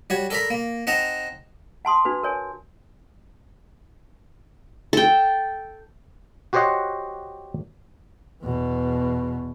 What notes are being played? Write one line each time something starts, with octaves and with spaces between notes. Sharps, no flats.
G3 F#4 C#5
A4 A#4 D5 A#5 B5
A#3
C4 D#4 F#5 A5 A#5
F#5 A5 C6 D#6
D4 F#4 B4
A#4 C#5 G#5
A4 G5
F#4 G4 C5 C#5 D#5 F#5
E2 B2